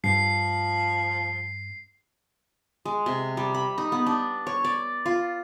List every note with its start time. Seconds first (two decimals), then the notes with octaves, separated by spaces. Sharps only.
0.04 G2 F3 C7
2.85 G#3
3.06 C3
3.37 G3
3.54 B5
3.78 D#4
3.92 B3
4.06 D4
4.47 C#5
4.65 D5
5.06 F4